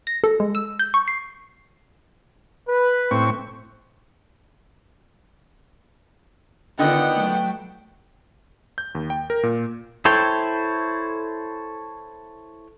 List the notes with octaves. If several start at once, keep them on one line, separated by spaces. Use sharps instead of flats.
A#6
A4
G#3
E6
G6
C#6
C7
B4
A2 C4 C#6
D3 D#3 B3 F4 D#5 F#5 G5
F#3 A3
G6
D#2
G5
A#4
A#2
E4 A4 C5 C#5 G5